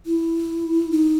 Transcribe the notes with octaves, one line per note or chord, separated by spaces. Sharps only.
E4
D#4